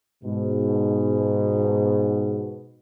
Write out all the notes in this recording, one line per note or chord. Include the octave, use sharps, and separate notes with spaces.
G#2 B2